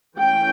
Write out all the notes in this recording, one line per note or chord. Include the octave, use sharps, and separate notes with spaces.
E3 A3 C#4 G5